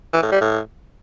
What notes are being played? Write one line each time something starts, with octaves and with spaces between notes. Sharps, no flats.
E3
A2
G3
A2